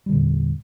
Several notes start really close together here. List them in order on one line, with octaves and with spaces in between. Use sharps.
G3 D3 A#2 E2